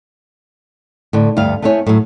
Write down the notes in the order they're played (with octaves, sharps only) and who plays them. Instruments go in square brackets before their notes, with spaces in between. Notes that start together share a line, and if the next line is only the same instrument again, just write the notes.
[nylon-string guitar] A2 D3
D2 G2 B3 F5
A3 B3 E4 C5 C#5 G#5
A2 F#3